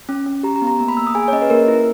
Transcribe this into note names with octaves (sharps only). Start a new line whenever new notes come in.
C#4
C#4
G4 A#5
A#5
B3
A#5
A#3 A#5
B5
A#3 E6
D#6
G#4 G#5
C#5
C#4 D#5
B4
A#3 A#4
E4